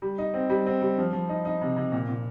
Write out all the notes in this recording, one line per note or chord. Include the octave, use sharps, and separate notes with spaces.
G3
D#4
C4
G3
C4
G3
F3
F3
D#4
D#4
C3
C3
A#2
A#2